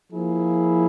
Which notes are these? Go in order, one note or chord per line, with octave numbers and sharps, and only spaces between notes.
F3 A#3 E4 G#4